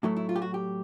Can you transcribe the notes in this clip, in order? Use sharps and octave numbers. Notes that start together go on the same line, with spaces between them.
A2 F#3 A3 E4
E4
F4
G4
F#4
G4